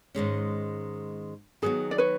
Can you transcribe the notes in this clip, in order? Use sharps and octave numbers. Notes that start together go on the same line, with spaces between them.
G#2 D#3 G#3 C#4
D#3 F#3 B3 D#4 F#4 G#4
D5
B4 C#5